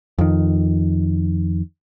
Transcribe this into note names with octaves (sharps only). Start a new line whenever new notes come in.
F2 D#3